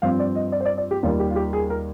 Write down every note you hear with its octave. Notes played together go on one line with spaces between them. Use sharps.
G2 F3 C4 F5
D5
D#5
D5
C5
D5
D5
G4
D#2 D#3 G3 F4
G4
F4
G4
G#4
A#4